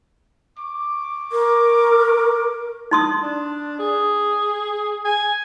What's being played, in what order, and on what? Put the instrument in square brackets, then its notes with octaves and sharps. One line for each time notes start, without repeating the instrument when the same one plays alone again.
[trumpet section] C#6 D6
[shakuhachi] A#4
[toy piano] D#4 C6 D#6
[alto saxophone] D4
G#4
G#5